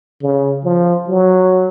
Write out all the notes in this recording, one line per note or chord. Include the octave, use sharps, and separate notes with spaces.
C#3
F3
F#3